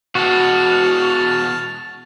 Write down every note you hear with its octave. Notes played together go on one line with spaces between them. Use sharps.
B2 E3 G#3 F#4 A5 F6